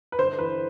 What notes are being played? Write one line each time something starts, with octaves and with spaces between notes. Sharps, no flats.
B4
G1 C5
E3 B4